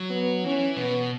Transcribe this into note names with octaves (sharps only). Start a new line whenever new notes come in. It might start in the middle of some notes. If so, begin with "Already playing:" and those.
Already playing: F#3
B3
E3 C#4
B2 B3